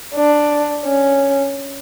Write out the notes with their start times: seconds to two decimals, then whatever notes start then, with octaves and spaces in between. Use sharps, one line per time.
0.14 D4
0.85 C#4